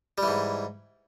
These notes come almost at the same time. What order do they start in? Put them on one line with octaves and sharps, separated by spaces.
G3 E3 G#2